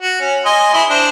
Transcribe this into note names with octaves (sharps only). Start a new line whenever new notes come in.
F#4
C#4
D#5 G#5 C6
E4 G#4 C6
D4 C5